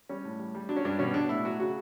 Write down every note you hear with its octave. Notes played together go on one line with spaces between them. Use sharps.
G3 C#4
A2
G3
G3
F#3 D4
C#4
G2 D4
B2 C#4
B2 D4
A2 E4
F#3 F#4
C#3 F#4